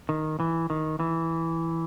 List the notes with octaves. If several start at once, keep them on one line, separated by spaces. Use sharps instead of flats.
D#3
E3
D#3
E3